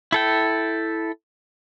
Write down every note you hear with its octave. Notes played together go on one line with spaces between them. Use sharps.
E4 A4 G5